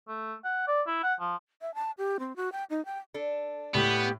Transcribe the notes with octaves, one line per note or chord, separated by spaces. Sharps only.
A3
F#5
D5
E4
F#5
F3
E5
A5
G4
C4
F#4
G5
D#4
G5
D4 A4
A2 B3 G4